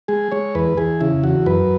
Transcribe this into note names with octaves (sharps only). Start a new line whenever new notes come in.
G#3 G#4
G#3 C#5
E2 B4
E2 G#4
C#3 E4
E2 F#4
F#2 B4